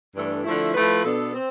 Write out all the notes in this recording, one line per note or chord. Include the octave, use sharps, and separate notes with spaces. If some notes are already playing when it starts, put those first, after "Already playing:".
G2 E3 A3 D4 A4
D3 F3 A3 E4
F3 A3 E4 B4
B2 B3 D4 A4
C4